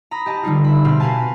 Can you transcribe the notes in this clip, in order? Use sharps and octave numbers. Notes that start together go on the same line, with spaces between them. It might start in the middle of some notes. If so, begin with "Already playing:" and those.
A#5 B5 D#6 A#6
G4 D#5 A5
D3 G3 D#4 F4
E5 B5
B2 C4 B4 C6 F6
A#4 B4 F5 G#5 A5